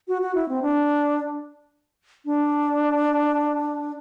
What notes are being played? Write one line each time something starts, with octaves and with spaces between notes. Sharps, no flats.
F#4
F#4
E4
C4
D4
D4